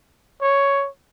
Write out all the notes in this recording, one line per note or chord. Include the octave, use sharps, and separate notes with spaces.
C#5